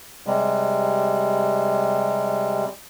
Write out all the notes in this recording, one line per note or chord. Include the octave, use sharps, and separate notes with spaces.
C3 G3 G#3